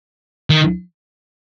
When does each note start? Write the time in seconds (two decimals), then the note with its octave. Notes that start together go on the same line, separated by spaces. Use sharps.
0.50 D#3